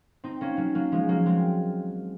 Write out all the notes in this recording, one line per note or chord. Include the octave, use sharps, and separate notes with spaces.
C4 D#4
A#3 C#4
F#3 A#3
F#3 A#3
F3 G#3
F#3 A#3
G#3 C4